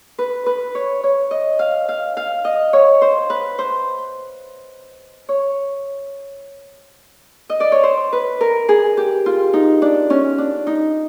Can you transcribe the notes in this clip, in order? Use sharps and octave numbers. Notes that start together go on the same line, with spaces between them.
B4
B4
C#5
C#5
D#5
F5
F5
F5
D#5
C#5
C5
B4
C5
C#5
D#5
D5
C#5
C5
B4
A#4
G#4
G4
F4
D#4
D4
C#4
D4
D#4